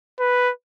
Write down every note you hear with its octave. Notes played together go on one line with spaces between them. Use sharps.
B4